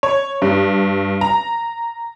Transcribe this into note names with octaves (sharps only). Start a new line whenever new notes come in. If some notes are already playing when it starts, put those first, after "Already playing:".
C#5
G2
A#5